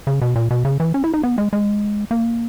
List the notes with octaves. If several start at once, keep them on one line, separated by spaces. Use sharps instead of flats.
C#3
B2
A#2
B2
C#3
E3
C#4
E4
D#4
B3
G#3
G#3
A#3